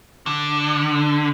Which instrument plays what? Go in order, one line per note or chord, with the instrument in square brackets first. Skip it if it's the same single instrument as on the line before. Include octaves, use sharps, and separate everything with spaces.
[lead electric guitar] D3